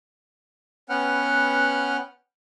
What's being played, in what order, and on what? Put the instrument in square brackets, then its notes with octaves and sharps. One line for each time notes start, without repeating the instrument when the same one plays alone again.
[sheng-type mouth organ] B3 C#4 B4 F#5 G5 F6